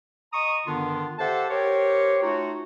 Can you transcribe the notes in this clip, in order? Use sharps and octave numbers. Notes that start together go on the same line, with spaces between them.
D#5 A#5 C#6 D#6
G2 D3 D#3 B3 D4 F4
G4 A4 C5 E5 F#5 A5
G4 A#4 C5 C#5
A3 D#4 F4 F#4